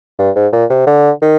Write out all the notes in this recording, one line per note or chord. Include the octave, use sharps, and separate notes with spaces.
G2
G#2
A#2
C3
D3
D#3